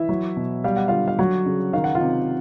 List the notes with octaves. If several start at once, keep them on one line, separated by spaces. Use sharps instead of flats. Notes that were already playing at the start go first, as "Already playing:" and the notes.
Already playing: E3 E4 E5
F#3
B2
G3 F5
F#5
D3 F4 F5
F5
F#3 F#4 F#5
C#3
D#3 F5
F#5
F4 F5
C3